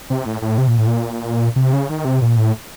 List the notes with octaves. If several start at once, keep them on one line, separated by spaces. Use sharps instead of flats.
C3
A2
A2
C3
A#2
A2
A#2
C3
C#3
D#3
C3
A#2
A2